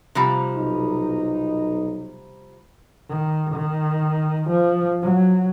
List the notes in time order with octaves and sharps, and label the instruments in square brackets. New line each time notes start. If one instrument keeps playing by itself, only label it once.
[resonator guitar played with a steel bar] C3 F3 G3
[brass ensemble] B1 D#4
[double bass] D#3
D#3
F3
F#3